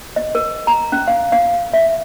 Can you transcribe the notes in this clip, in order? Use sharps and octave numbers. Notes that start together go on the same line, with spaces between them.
D#5
A#4
A#5
C#4
F5
F5
E5